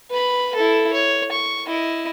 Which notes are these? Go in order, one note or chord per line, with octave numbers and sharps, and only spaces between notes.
B4 B5
E4 A4
C#5
C#6
E4 D#5